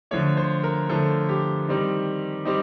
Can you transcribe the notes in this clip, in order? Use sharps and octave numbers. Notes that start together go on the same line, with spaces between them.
D3 F3 A3 C#5
C5
A#4
D3 F3 A3 A4
G4
D#3 G3 C4 D#4
G3 C4 D#4 G4